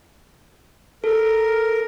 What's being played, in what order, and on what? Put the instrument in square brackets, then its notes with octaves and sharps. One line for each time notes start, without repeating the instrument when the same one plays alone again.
[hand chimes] A4 [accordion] A#4